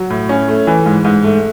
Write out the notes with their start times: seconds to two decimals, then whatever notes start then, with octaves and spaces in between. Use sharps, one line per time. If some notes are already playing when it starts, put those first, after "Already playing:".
Already playing: F#3
0.10 A2
0.29 C#4
0.48 A3
0.67 E3
0.86 G#2
1.05 G#2
1.24 A3